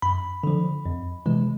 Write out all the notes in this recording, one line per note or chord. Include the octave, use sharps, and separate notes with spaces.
F#2 B5
D3 F3
F2
C3 E3 G#3